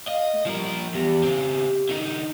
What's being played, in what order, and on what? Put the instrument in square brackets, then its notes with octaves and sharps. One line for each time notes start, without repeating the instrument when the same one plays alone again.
[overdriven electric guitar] D#5 [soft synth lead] F5
[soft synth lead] A3
[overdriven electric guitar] F3 A#4 [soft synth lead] G3
[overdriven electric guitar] E2 [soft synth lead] G4
[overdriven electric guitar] C#3 C4
D3 D#4